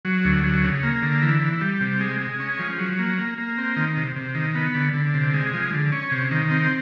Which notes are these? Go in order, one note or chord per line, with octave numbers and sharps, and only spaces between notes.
F#3
D2
F#3
C#3
A#3
D3
E3
E3
G3
C3
G#3
G#3
C#4
F3
F#3
A#3
A#3
A#3
C4
D#3
C3
C3
D#3
B3
D3
D3
C3
G#3
F3
D3
C#4
C3
D#3
C4